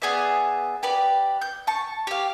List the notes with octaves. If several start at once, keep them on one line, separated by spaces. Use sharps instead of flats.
B3 G#4 D5 E5
G4 B4 D5
G6
A5 C#6
G4 F5